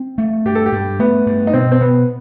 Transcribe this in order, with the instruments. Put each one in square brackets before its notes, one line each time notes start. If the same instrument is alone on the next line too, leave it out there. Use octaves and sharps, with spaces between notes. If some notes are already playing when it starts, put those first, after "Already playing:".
Already playing: [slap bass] C4
A3
[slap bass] G2 [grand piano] G4
[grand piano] A4
G4
[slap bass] G2
[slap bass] A3 [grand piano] B3
[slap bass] G2
[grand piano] D#4
[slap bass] B2 [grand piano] C4
[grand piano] C4
[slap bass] B2 [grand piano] B3